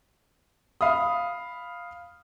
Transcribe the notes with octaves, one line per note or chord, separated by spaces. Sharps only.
F5 B5 D#6